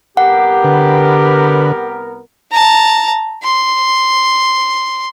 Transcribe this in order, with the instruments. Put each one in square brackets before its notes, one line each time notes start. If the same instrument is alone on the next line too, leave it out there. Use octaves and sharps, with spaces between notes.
[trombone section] C2 B3 A#4 [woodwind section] G4 [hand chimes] F#5
[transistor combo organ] D3 B4
[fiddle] A5 A#5
C6